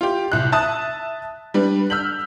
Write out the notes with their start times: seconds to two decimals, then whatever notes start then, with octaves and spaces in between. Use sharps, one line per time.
0.01 F4 G4
0.32 C2 F#6
0.52 E5 A5 D#6 F#6
1.54 G3 D4 B4
1.90 E6 F6 G6 B6 F#7